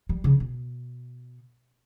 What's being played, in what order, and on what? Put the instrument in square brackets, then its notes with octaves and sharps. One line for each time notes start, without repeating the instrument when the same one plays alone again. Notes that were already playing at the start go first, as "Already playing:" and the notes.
[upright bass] G3
C#3
B2